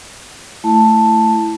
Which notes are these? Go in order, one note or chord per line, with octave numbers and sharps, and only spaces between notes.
A3 E4 A5